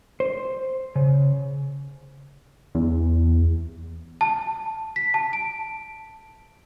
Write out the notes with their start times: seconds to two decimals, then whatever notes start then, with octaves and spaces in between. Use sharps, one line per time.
0.20 C5
0.96 C#3
2.75 E2
4.21 A5
4.96 B6
5.14 A5
5.33 D7